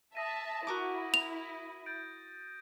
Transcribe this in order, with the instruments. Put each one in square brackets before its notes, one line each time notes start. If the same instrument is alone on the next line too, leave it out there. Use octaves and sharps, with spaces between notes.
[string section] E5 A5 [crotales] D#6 A#6 D#7
[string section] E4 [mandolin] F#4 A#4 D6
[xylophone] F7
[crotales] G6 A6 D7